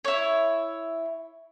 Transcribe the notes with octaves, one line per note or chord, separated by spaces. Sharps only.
E4 C#5